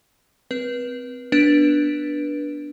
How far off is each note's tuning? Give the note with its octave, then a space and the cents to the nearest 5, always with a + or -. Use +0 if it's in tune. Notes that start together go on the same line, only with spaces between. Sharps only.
C4 -20 B4 -30
B3 +0 D4 +0 B4 -30